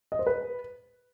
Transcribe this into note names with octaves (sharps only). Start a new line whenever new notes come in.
D#5
C5
B4